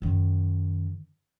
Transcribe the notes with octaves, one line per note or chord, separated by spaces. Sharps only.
F#2 D#3